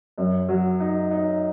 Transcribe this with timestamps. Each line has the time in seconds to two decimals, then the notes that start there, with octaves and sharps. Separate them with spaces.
0.18 F#2
0.49 F#3
0.80 D#4
1.11 D#4